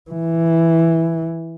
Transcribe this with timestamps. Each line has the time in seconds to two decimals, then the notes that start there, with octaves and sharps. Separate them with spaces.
0.11 E3